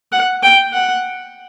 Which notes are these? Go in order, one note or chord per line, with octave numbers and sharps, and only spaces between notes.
F#5
G5
F#5